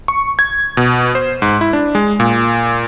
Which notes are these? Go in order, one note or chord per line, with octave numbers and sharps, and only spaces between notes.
C#6
G#6
B2
C5
G#2
E4
D4
G#3
A#2